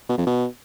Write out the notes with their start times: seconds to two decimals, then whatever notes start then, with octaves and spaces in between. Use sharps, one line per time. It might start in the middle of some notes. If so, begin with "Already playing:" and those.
0.09 B2
0.18 F2
0.27 B2